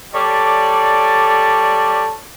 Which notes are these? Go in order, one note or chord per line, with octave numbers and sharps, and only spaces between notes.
G3 A4 C#5 D5